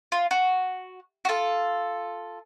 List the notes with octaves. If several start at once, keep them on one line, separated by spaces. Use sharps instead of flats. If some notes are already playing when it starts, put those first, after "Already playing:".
F4
F#4
F#4
F4 A4